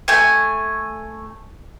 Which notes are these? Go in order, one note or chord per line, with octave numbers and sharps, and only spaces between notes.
A3 G#5